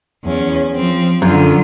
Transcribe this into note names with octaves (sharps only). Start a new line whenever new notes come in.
E2 C#4
F3 C4
F#2 D3 F4